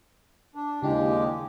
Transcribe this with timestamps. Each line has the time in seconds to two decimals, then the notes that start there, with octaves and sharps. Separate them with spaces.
0.55 D4
0.82 D#2 C#3 G#3 D4 E4 G4